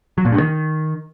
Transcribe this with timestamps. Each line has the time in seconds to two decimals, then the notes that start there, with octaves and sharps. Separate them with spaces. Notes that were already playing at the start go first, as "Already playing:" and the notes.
0.18 F#3
0.25 A#2
0.32 G2
0.40 D#3